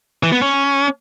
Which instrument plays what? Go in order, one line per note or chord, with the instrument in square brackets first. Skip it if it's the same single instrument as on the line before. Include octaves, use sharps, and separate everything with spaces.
[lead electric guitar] E3
B3
C#4